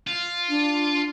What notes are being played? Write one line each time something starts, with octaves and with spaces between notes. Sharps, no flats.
F4
D4